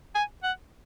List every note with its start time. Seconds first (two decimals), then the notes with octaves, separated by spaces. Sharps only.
0.15 G#5
0.43 F#5